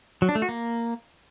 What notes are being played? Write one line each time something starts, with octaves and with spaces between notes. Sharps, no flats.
F#3
D4
A3
F#4
A#3